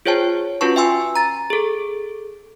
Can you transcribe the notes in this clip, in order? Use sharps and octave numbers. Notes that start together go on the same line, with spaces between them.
F4 G#4 C5 C#5 G5 A5
C#4 F4 F#4 B4 A5 C#6
E5 G5 G#5 C6 E6
A#5 A6
G#4 A4